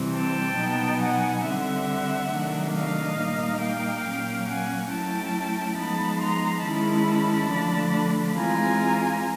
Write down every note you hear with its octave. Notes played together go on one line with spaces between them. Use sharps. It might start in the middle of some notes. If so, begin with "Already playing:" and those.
Already playing: C3 E3 G3 C4
G5 A5
B2 F#3 B3 D#4
F#5 G#5
D3 G3 C4 E5 F#5
C3 D#3 F#3 A3 D4
D#5 F5
A#2 G3 A#3 D#4
F5 G5
A#2 F#3 A#3 C#4
F#5 G#5
F#3 A3 C#4 E4 G5 A5
F3 G#3 B3 D#4 A5 B5
A#5 C6
D#3 G#3 C#4 E4 A5 B5
D3 F3 A3 D4
E3 G#3 C4 F4 G#5 A#5